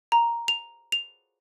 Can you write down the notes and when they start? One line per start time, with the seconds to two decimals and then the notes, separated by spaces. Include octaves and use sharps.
0.12 A#5
0.48 F7
0.92 F7